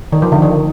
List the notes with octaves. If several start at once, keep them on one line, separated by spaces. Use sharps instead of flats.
D#3
F3
D3
D#3